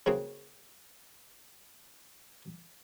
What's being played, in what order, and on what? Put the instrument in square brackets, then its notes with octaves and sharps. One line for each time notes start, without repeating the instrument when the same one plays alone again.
[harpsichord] C#3 A#3 C4 F#4 G#4